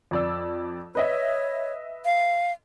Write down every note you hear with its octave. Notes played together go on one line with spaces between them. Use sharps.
F2 D5 E6
B4 C#5 D#5 E5
F5